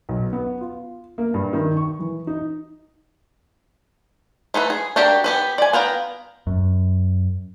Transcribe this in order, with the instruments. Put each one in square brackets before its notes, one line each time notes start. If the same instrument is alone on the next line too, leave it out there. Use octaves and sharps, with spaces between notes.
[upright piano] B1
B3
F4
A#3
G2
D#3
C#6
E3
D#4
[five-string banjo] A3 D#4 E4 B4
G#4
D4 F#4 G4 A#4 G5
B3 G4 B4
D5 G#5
B3 F5 G5 A#5
[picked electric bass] F#2